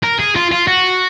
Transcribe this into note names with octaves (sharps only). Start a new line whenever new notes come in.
A#4
G#4
F4
F4
F#4